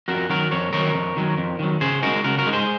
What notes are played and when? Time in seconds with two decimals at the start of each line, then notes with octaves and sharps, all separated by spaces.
0.08 F2 F#4 A#4
0.30 D#3 F#3 F#4 A#4
0.51 F2 A#4 C#5
0.73 D#3 F#3 A#4 C#5
0.94 F2
1.17 D#3 F#3
1.37 F2
1.59 D#3 F#3
1.81 C#3 G#4 C5
2.03 G#3 D#4 F#4 A#4
2.24 C#3 F#4 A#4
2.39 F#4 A#4
2.46 G#3 D#4
2.53 G#4 C5